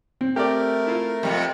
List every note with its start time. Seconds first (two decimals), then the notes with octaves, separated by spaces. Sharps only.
0.21 C4
0.36 A3 G4 A#4 D5
0.87 E4 F4
1.23 F2 C3 G3